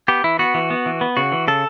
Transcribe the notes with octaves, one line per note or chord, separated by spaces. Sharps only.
B3 G4
E3 E4
B3 F#4
E3
B3
E3
B3
C#3 F#4
E3
C#3 A4